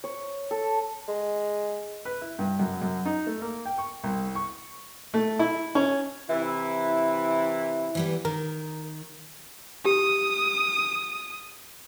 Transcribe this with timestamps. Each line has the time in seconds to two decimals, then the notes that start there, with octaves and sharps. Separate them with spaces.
0.04 C#5
0.51 A4
1.08 G#3
2.05 B4
2.21 E4
2.39 G2
2.59 F#2
2.82 F#2
3.06 D#4
3.27 A3
3.42 A#3
3.66 G5
3.78 C#6
4.04 C2
4.35 C#6
5.14 A3
5.39 E4
5.75 C#4
6.29 C3 E3 E4
7.95 E3 G3 B3
8.25 D#3 A#4
9.85 G4 D#6